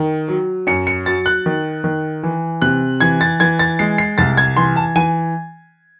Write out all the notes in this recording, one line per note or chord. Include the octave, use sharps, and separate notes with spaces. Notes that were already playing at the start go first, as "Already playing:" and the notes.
Already playing: D#3
F#3
F#2 C#7
C#7
F#3 A6
F#6
D#3
D#3
E3
C3 F#6
E3 G#6
A6
E3 G#6
A6
G#3 C7
C7
C2 A6
G#6
E3 C6
A5
E3 G#5